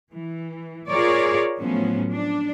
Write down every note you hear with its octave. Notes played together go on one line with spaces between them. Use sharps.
E3
F4 G#4 A#4 C#5 D5
A2 F3 F#3 B3 C#4
D4